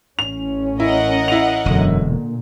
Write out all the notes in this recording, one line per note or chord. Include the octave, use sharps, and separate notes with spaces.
A1 C#4 F7
E4 A#4 D#5 F#5
E4 F7
E1 F#2 D3
A#2